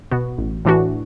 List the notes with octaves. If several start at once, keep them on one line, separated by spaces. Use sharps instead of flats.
B2 B3 F#4
A1
A2 E3 D4 F#4